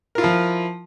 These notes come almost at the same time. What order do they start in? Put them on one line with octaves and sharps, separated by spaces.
A#4 F4 E4 F3